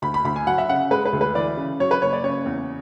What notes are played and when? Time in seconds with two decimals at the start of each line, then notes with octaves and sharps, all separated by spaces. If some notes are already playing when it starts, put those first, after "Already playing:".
0.02 D2 B5
0.14 B5
0.24 D2 B5
0.36 G#5
0.47 F#3 F#5
0.58 E5
0.69 C#3 F#5
0.91 G#3 B4
1.05 B4
1.13 D2
1.21 B4
1.35 E3 D5
1.57 C#3
1.80 F#3 C#5
1.91 B4
2.02 F#1 C#5
2.13 D5
2.24 C#3 C#5
2.46 E2